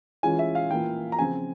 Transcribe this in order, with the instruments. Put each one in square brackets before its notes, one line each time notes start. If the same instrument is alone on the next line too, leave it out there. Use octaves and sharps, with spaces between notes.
[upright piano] E3 G#3 C#4 F4 [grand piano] G#5
[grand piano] E5
F5
[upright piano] E3 A#3 F4 [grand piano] G5
[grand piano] A#5
[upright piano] C#3 F3 C4 F4 [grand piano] G#5